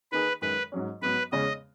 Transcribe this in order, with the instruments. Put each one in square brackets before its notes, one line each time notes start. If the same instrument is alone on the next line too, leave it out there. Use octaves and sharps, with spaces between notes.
[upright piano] D#3 A#3 D#4 G#4 [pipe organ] B4
[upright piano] F#2 D#3 G#3 [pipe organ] B4
[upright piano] G#2 F#3 C#4
[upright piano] G#2 F#3 B3 [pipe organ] B4
[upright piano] E2 C#3 G#3 C#4 [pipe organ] D#5